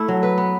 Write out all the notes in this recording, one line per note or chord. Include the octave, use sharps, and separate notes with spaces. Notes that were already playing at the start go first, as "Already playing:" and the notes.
Already playing: A3 E4
F#3
B4
B3